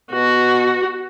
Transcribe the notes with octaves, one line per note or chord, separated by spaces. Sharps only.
B2 F#4